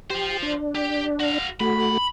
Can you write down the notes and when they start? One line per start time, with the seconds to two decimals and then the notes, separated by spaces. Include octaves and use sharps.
0.10 F4 G4 C5
0.42 D4
0.75 G4
1.20 F#4 F5
1.60 A3 F#4 B5